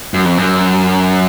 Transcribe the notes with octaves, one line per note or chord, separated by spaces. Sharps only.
F#2
F2
F#2